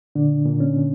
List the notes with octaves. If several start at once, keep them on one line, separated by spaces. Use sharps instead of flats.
A#2 D3 D4
A#2
C#4
A#2